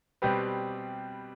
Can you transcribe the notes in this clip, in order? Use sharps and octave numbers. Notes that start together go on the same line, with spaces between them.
B2 G3 C4 G4 B4